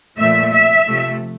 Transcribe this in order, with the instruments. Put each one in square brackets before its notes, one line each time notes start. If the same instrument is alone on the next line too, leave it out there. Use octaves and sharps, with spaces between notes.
[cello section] A#2 F3 A3 E5
E5
C3 F3 A3